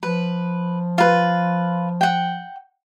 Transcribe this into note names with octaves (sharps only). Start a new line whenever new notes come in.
F3 B4
F4 B4
F#5 G5